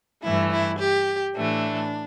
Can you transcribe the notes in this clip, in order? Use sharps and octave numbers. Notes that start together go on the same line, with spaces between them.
G2 E3 A3 E4
E4
G4
A2 E3 A3 D4